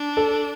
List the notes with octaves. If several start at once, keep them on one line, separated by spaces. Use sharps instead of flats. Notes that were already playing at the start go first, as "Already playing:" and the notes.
Already playing: D4
A4